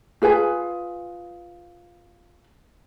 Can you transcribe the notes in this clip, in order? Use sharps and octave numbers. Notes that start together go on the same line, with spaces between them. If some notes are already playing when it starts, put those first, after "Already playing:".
F4 G#4 B4 G#5